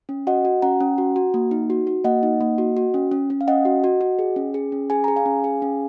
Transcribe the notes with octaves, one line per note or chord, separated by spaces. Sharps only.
C#4
F#4 D#5 F#5
F#4
C#4 F#5 A#5
C#4
F#4
F#4
A#3
D#4
F#4
F#4
A#3 D#5 F#5
D#4
A#3
F#4
F#4
C#4
C#4
C#4
F5
C#4 D#5 F#5
F#4
F#4
F#4
G#4
C#4
G#4
C#4
G#4 G#5
G#4 A#5
F5 G#5
C#4
G#4
C#4